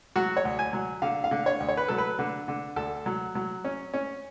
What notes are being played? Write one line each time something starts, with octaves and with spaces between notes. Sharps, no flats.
F#3 F#4
C#5
D2
G#5
F#3
D3 F5
F5
D3
C#5
D2
C#5
B4
F#3 A4
B4
D3
D3
D2 A4
F#3
F#3
C#4
C#4